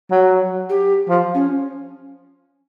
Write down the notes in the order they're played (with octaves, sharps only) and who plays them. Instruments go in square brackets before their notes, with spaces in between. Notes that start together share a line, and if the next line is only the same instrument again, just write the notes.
[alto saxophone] F#3
[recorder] G4
[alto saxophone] F3
[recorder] C#4